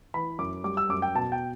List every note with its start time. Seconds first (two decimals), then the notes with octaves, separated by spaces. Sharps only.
0.14 E3 B5
0.39 F#2 D6
0.64 G3 D6
0.77 E6
0.89 F#2 D6
1.02 G5
1.15 B2 A5
1.32 G5